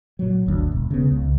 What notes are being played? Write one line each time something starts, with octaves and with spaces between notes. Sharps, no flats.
A#2 F#3
G1 D2
E1
C#3 B3
C#2